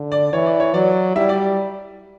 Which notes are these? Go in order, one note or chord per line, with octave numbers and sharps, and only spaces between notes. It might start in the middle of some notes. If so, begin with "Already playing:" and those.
Already playing: D3
D5
E3 C#5
D5
C#5
F#3 D5
G3 E4 E5
D5